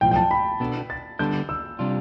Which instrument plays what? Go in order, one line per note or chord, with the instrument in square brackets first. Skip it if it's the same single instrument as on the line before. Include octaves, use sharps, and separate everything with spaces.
[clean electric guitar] B1 A2 F3 [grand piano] G5
[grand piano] G5
A5
B5
[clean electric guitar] B2 B3 D4 A4
[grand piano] A6
[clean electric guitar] D3 G3 B3 D4 A4 [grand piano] G6
[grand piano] E6
[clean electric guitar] C3 G3 D4 F4